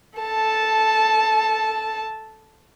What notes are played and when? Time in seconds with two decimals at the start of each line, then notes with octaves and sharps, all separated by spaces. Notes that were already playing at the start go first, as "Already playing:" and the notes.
0.19 A4 A5